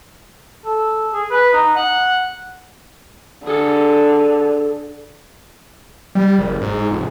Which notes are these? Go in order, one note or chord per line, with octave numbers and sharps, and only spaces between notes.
A4
G#4
B4
D#4
F#5
D3 G#4 A4
G3
F#1
G#2
F1